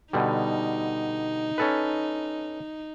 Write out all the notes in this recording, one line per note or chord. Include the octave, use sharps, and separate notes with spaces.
B2 D3 G3 D#4
C#4 A4 B4